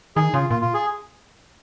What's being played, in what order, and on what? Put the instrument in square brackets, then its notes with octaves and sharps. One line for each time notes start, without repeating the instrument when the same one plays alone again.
[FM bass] D#3 [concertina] G#4
[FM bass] C#3 [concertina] F4
[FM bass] A#2 [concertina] F4
[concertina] F4
G#4